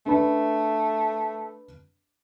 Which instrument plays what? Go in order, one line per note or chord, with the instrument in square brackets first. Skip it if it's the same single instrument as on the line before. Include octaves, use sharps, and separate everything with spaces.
[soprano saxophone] A3 [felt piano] D4 B4 B5